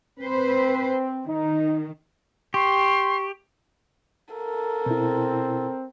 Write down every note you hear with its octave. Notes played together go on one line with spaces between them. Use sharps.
C4 B4 C5
D#3 D#4
G4 C6 C#6
A4 A#4
B2 C4 E4